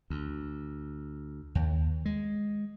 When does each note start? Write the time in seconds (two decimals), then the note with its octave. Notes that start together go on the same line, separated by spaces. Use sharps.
0.10 D2
1.55 D#2
2.05 G#3